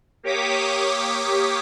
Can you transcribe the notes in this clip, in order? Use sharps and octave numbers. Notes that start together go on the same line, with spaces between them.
A#3 G4 C#5 D6 D#6 B6